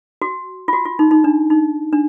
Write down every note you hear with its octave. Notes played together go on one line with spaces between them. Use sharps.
F#4
F4
F#4
F4
D#4
D#4
D4
D#4
D4